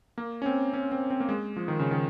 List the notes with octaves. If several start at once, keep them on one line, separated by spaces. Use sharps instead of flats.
A#3
C#4
C4
C#4
C4
C4
A#3
G#3
F3
D#3
C#3
D#3